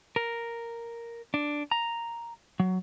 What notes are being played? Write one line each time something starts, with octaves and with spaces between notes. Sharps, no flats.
A#4
D4
A#5
F#3